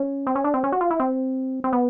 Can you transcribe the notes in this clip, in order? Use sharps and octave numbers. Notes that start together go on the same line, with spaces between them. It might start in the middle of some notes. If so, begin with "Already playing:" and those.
Already playing: C#4
C4
C#4
D4
C4
C#4
F#4
F4
E4
C4
C4
B3